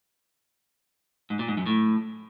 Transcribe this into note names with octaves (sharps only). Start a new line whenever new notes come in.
G#2
A#2
G#2
F#2
A2